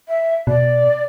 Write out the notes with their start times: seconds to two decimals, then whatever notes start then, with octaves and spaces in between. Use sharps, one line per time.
0.08 E5
0.47 B2 D5